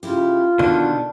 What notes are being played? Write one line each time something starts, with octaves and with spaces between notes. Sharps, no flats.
C#3 E4 F4 G4
B2 D3 D#3 D4